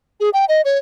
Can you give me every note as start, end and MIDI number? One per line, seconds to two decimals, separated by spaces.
0.20 0.30 68
0.33 0.45 79
0.49 0.61 75
0.65 0.78 73